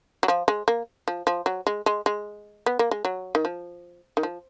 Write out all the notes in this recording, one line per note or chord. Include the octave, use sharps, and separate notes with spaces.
F#3
F3
G#3
A#3
F3
F3
F#3
G#3
G#3
G#3
B3
A#3
G#3
F#3
D#3
F3
D#3
F3